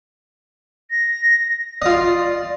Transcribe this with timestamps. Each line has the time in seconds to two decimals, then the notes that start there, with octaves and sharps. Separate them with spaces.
0.91 A#6
1.82 F4 D5 D#5